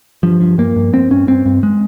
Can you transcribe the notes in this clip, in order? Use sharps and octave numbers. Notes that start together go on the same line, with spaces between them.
G2 F3
G2
G2 A#3
G2
G2 C4
G2 C#4
G2 C4
G2
G#3